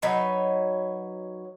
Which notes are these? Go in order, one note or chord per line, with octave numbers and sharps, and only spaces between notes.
F#3 D#4 B4 C#5